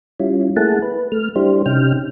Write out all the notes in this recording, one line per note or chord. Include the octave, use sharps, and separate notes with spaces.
G3 C#4 E4 F4
A3 A#3 E4 G#4 F#5 A5
B4
A3 F6
G3 D4 E4 G4 C5
C3 C#4 D#4 G4 G5 F6